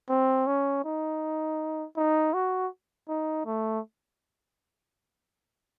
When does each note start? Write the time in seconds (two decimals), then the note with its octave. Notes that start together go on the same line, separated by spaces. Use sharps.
0.10 C4
0.47 C#4
0.85 D#4
1.97 D#4
2.34 F#4
3.09 D#4
3.46 A3